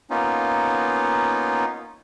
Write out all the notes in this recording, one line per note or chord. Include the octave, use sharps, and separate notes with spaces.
A#3 B3 C#4 D#4 F4